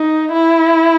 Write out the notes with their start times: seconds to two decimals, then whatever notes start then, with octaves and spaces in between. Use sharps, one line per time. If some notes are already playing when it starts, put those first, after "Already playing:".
Already playing: D#4
0.33 E4